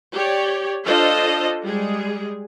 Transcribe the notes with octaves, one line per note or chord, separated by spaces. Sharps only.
G4 C#5 D5
D4 F4 A4 C5 D#5
G3 G#3 G#4